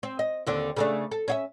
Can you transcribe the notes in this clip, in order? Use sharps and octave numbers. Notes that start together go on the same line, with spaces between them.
C4
D#5
D#2 D3 C4
C#3 A3 D4
A4
C#4 F4 E5